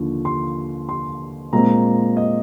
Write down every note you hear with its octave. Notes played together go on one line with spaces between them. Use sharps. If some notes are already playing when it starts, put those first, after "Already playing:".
Already playing: D#2 D3 F3
C6
C6
A#2 G#3 C4 A#5
D#5